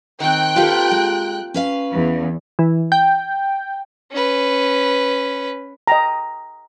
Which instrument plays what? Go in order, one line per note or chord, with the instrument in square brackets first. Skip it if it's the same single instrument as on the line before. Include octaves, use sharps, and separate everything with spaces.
[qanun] D#3 C4 [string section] G5 F#6
[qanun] A#3 F4 A4 [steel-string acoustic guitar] G4 B4
[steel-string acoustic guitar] G#3
C#4 B4 F5
[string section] E2
[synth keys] E3
G5
[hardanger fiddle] C#4 B4
[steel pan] D#5 G5 A#5